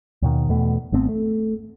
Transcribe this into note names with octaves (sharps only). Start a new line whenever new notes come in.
D#2 B2 D#3
E2 B2 A3
G#1 A3 B3 C4
A3